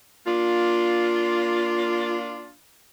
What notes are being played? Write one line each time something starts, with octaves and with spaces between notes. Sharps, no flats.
A#3 D4 F4